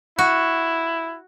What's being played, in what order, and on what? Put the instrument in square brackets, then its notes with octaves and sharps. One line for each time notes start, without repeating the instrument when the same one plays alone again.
[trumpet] E4 [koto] F#4